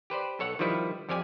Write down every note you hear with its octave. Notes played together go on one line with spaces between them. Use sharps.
G4 B4 C5 D5
B1 A4 C#5 F#5
D#3 F3 G3 E4 B4
F2 F3 G4 D5 G#5